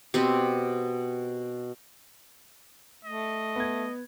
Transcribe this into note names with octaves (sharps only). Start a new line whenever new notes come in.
B2 C4 G4
A3 D#5
B3 G#6